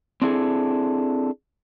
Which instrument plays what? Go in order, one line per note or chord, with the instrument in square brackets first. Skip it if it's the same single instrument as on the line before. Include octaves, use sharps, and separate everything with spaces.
[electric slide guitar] C4 D4 E4 G#4 A4